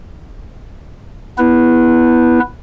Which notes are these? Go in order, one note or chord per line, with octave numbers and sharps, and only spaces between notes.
B3 E4 B4